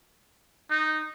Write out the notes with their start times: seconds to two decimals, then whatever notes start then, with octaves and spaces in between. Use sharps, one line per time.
0.70 D#4